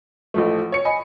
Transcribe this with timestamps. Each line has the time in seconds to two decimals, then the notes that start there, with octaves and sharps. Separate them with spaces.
0.34 A1 F3 A3
0.72 C#5 C#7
0.85 D#5 G#5 B5